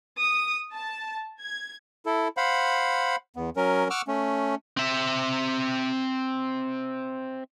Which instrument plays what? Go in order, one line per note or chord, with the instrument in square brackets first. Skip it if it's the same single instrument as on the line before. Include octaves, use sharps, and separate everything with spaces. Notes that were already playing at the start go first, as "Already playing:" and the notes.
[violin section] D#6
A5
G#6
[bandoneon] E4 A4
C5 F5 F#5 B5
E2 B3
F#3 C#4 A#4
F#5 C#6 D6 E6 F6
A3 C#4
[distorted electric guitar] C4 E5